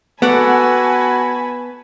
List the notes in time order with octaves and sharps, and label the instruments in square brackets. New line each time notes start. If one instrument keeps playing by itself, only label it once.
[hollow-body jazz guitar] B3 [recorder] F#4 [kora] A4 D5 F#5 [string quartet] G#5 A5 B5